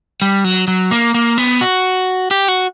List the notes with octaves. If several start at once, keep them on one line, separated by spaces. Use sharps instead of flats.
G3
F#3
F#3
A#3
A#3
B3
F#4
G4
F#4